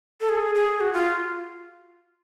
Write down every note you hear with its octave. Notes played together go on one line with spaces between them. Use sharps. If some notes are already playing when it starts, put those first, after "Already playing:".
A4
G#4
G#4
F#4
F4